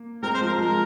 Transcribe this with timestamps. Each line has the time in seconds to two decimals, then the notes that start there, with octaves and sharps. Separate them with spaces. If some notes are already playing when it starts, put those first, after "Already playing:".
Already playing: A#3
0.23 G#3 C4 A#4
0.34 C5
0.41 F3 G#3
0.47 A#4
0.58 F3 G#3 A#4